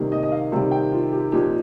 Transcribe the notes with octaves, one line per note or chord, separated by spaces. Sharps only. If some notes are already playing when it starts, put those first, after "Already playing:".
Already playing: C3 D#3 G3 A#3
D#5
D#5
F5
C3 D#3 G3
G5
F4
G4
A#2 F3 D#4 G4